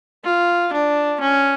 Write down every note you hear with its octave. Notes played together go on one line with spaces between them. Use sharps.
F4
D4
C#4